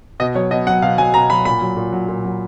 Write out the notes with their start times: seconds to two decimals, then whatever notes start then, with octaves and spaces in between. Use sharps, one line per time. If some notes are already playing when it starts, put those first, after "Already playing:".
0.20 B2 D#5
0.35 F#3 C#5
0.51 B2 D#5
0.67 F#3 F#5
0.82 B2 F5
0.98 F#3 G#5
1.14 B2 A#5
1.30 F#3 B5
1.45 A#2 B5
1.61 F#3
1.77 A#2
1.92 F#3
2.08 A#2
2.24 F#3